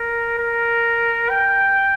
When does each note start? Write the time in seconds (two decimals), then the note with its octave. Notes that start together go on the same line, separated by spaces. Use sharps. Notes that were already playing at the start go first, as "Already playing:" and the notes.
Already playing: A#4
0.38 A#4
1.30 G5